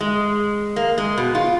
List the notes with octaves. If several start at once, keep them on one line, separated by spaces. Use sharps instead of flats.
G#3
A#3
G#3
B2
F4